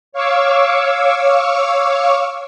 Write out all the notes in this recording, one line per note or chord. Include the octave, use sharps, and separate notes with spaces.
C#5 F5 C#6 D6 E6